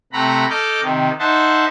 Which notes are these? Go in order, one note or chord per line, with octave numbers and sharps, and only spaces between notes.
C3 A3 F#5 A#5 B5
A4 D#5 D6 F6 G6
C3 D#3
D#4 C5 E5 F#5 A5